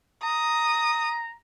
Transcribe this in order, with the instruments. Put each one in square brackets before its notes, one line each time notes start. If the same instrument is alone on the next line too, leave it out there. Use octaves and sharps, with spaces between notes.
[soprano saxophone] A#5 [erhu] D#6